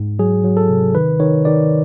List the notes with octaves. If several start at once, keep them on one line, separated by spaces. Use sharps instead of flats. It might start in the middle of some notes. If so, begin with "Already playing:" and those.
Already playing: G#2
F#3 G#4
F#3
A4
C3
D#3 B4
D#3 C#5
D#3 D5